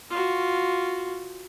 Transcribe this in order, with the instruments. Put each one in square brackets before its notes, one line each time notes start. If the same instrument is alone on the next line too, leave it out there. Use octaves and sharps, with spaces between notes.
[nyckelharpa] F4 F#4